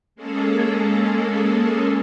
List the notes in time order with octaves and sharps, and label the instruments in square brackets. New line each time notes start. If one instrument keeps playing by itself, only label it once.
[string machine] G#3 A#3 C#4 G#4 A4